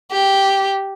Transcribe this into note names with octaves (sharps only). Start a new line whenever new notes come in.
G4